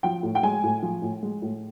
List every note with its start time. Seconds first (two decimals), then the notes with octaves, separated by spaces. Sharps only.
0.03 F3 G5
0.23 A2
0.35 G5
0.43 G#3 G#5
0.63 A2
0.82 F3
1.02 A2
1.23 G#3
1.42 A2